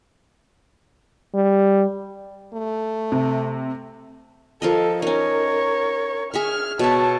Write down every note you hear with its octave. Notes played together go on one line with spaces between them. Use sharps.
G3
A3
C3
F3 A4 A#4 D#5
C#4 D#4 A#4 C#5
G#4 E5 C#6 F6
B2 C#5 E5 A5